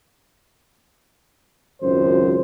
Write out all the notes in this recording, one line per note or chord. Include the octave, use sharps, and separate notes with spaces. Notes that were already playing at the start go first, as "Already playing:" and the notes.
G#1 C#2 F#2 C5